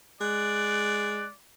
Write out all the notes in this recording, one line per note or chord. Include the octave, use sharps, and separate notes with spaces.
G#3 D5 F#6